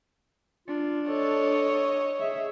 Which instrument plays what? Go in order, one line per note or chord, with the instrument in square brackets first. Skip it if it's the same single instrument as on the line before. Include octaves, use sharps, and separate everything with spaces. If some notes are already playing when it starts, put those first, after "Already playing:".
[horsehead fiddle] D4 [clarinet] F4
[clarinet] A4 [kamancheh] C#5 D#5
[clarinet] G#4 [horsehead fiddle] E5